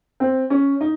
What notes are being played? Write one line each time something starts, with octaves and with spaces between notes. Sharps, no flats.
C4
C#4
D#4